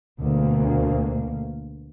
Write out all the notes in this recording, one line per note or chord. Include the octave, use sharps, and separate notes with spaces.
D2 B2 A#3